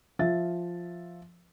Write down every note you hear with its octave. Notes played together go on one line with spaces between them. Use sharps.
F3 E5 A6